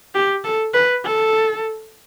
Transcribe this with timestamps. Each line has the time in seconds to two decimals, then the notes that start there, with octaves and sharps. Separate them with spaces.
0.15 G4
0.44 A4
0.74 B4
1.04 A4